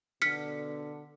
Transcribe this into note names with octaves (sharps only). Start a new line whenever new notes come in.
B2 D3 F6 B6 C#7